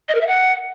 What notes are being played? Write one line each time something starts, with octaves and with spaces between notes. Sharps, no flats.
D#5
A#4
E5
F#5